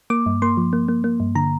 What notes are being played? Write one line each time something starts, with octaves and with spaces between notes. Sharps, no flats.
A#3 D6
G2
A#3 C6
F3
A#3
A#3
A#3
G2
D3 A#5